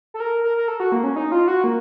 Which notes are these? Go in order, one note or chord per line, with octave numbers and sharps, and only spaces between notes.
A4
A#4
A#4
A#4
A4
F#4
A#3
C#4
D#4
F4
F#4
A#3